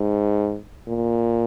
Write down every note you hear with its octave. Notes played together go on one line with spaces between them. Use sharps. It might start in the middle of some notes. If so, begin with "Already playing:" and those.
Already playing: G#2
A#2